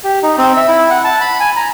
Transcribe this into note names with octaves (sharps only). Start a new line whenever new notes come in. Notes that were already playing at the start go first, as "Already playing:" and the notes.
G4
D#4
C4
E5
E4
F#5
A5
B5
G#5
A#5